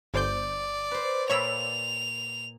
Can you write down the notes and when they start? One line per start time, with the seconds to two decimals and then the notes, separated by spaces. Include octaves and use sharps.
0.14 G1 C5 D5 G6
0.91 B4 C5
1.30 A#2 C#5 D5 F5 B5 E6 F7